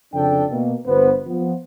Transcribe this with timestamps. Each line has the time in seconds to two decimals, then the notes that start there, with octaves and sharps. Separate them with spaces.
0.14 F2 C#3 D4 A4 G5
0.51 B2 A#3
0.87 G1 B3 B4 C5
1.27 F3 B3